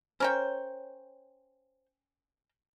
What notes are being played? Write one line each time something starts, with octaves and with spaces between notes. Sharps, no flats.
C#4 A#4 C5 C#5 G5